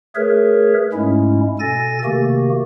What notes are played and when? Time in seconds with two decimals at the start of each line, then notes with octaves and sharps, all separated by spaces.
0.15 A3 G#4 A#4 B4 C#5 E5
0.93 G#2 G#3 A3 C#4 E4
1.59 B2 A4 G#5 A6 A#6
2.04 C3 D#3 A3 A#3 F#4 G4